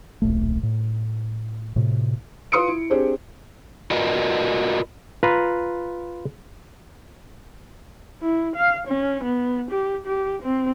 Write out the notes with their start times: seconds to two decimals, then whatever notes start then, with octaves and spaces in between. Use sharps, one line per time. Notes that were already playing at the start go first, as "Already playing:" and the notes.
0.22 D1 A#1 A3
0.63 A2
1.76 A2 C3
2.52 F4 B4 C6 D#6 C#7 D7
2.68 E4
2.90 C4 D4 G4 G#4 C5
3.91 F4 F#4 A#4 B4 D5 D#5
5.23 F4 B4 A#5
8.22 E4
8.56 F5
8.87 C#4
9.24 B3
9.71 G4
10.06 G4
10.42 C4